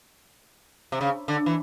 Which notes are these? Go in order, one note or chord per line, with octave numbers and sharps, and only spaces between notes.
C3
C#3
D3
E3